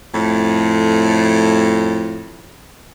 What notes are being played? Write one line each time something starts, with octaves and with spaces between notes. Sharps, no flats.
F2 A2